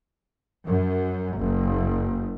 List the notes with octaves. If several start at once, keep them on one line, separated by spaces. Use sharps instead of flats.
F#2
F#1